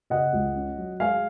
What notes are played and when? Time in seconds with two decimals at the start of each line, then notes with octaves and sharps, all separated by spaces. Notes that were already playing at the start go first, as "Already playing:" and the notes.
0.10 C#3 D#5 F#5
0.33 C#2
0.55 C#4
0.77 F#3
1.00 G#3 F5 G#5